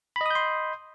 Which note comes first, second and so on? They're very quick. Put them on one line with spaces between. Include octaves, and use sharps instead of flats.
B5 D#5 D#6 G6 C6